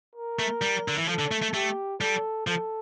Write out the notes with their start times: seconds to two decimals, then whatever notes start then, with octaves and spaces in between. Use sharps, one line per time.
0.15 A#4
0.39 A3
0.62 G3
0.88 D3
0.98 E3
1.08 F3 A4
1.19 D3
1.31 A3
1.42 A3
1.54 A3 G4
2.01 G3 A4
2.47 F3 A4